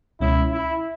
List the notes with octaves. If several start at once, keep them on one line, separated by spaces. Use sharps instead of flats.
C#2 B2 G#3 C#4 E4
E4